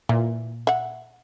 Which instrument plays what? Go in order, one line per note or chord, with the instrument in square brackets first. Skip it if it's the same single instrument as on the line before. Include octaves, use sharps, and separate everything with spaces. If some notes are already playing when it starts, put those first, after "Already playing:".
[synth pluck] A#2 [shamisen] E3
[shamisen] E5 F#5